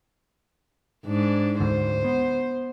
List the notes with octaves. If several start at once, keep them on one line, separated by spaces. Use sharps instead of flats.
G#2 D4
D2 G#2 D3 C5
B3